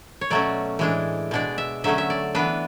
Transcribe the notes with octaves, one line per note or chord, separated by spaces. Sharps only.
C#5
B2 F#3 A3 C#4 D5
A2 E3 G#3 D4
B2 G#3 D4 D5
E5
D3 F#3 A3 C#4 E5
E5
D5
E3 B3 D4 B4